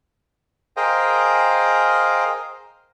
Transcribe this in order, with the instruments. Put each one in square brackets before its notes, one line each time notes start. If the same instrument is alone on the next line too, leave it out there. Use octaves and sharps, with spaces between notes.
[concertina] G#4 A#4 C5 D#5 F5 G5